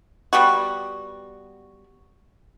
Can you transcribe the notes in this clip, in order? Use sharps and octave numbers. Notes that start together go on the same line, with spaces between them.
G3 B3 F#4